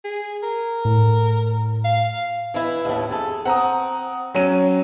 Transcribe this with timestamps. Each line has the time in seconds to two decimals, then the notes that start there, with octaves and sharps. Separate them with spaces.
0.04 G#4
0.43 A#4
0.85 A2
1.85 F5
2.54 E3 E4
2.85 D#2 A2
3.09 F2 G#4 A4
3.45 C4 F#5 A#5 D#6
4.34 F#3 C#4 D#7